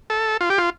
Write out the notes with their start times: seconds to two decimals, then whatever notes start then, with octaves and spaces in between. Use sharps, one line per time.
0.10 A4
0.41 F4
0.50 G4
0.58 F4